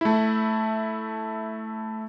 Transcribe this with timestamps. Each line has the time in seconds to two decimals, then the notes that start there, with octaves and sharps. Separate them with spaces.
0.01 A3 E4